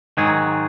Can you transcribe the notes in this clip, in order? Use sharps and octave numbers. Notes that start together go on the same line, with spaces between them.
G#2 D#3 F#3 G#4